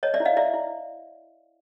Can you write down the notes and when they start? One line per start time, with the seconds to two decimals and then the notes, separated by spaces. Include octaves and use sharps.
0.03 C#5 D#5
0.14 D5 E5
0.20 E4
0.25 D#5 F5
0.37 E4 D5 E5
0.54 E4